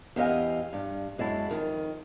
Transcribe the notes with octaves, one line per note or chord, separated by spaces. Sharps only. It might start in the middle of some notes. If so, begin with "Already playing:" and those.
E2 G4 D#5 F5 G#5
G2
F#2 G#3 E4 A5
F2 D#3